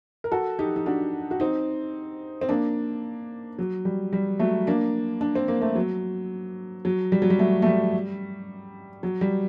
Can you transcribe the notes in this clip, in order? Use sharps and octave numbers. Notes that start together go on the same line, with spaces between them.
A#4
F#4 A4
D#4 G4
D#4
D4 F#4
F#4
C4 D#4
C4
A#3 D4
F#3
G3
G3
F#3 A3
A#3 D4
D4
C4
A#3
A3 C4
F#3
F#3
G3
F#3
G3
F#3 A3
A3
G3
F#3
G3